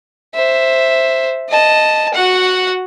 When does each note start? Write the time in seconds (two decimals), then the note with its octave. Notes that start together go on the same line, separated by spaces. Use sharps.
0.34 C5 E5
1.49 D#5 A5
2.14 F#4 F#5